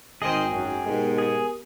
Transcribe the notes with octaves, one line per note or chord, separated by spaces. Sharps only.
G#1 D#3 G#4 C5 D#5 G5
F#2
G#2 B2 G#3 B3 G4 A#4
G#4